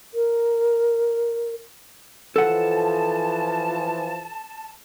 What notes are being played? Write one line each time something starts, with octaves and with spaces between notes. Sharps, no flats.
A#4
E3 F3 A4 F#5 A5